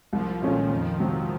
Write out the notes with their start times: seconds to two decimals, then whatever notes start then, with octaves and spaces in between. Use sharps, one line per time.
0.13 C2 F3
0.42 A#2 D#3 A3 C#4
0.70 F2
1.00 C3 F#3 C4